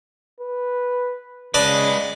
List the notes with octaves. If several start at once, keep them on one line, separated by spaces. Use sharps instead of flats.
B4
C#3 G#3 B4 D5 D#5 A5